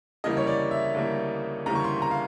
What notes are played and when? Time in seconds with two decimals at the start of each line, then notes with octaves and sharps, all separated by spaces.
0.24 D2 C#3 E3 G3 A#3 D#5
0.37 C#5
0.47 D5
0.71 E5
0.94 D2 C#3 E3 G3 A#3
1.66 D2 C#3 E3 G3 A#3 A#5
1.75 C#6
1.84 C6
2.02 A#5
2.11 F5